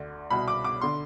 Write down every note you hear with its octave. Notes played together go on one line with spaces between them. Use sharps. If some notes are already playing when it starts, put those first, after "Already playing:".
Already playing: D2 D3
C2 B2 B5
D6
D6
D3 C6